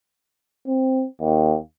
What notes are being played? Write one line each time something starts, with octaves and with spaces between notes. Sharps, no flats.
C4
D#2